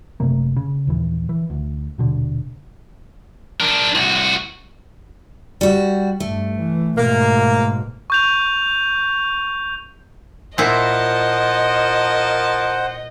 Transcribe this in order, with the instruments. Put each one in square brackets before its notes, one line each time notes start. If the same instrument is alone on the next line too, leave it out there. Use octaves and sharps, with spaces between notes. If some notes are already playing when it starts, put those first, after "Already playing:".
[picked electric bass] F#1 C3 A3 A#3
C#3
A#1 D#2 E3
E3
D2
D#1 B2 D3
[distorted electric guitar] D4 A#4
C2 F#4
[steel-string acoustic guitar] G3 F#4
[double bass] G2 [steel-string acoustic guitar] A3
[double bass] E3
[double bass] G#2 B2 [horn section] A#3
[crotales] C#6 G6 F7
[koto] A#2 E4 [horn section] F3 A#4 A5 [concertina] C5 F#5 [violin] D#5